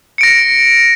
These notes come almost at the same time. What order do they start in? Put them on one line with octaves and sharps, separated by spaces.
C#7 D7 A#6